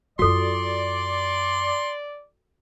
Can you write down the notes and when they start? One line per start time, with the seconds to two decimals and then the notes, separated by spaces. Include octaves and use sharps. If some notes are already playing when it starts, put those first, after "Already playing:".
0.19 F#2 F4 F#4 A4 D5 C6